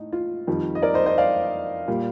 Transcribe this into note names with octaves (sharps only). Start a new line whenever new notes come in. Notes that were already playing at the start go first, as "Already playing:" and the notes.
Already playing: A2 D#4
F4
F2 D#3 G3
D#5
A#4 D5
C5 D#5
C5 D#5
D5 F5
A#2 G3